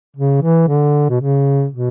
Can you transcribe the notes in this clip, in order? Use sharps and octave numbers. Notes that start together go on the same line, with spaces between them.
C#3
E3
D3
B2
C#3
B2